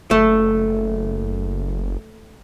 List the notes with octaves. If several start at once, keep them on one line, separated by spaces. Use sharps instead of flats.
F#1 A3